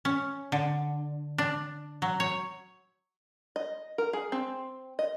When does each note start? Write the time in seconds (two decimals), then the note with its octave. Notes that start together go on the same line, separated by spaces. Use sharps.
0.05 C#4
0.52 D3
1.38 D4
2.02 F#3
2.20 C#5
3.56 D#5
3.98 A#4
4.13 G#4
4.32 C4
4.99 D#5